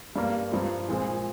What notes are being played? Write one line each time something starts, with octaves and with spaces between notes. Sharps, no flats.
G2 G3 A#3
G2 F3 C4
A#2 F3 G#3 C4